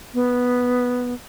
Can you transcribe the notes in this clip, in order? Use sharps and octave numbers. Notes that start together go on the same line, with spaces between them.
B3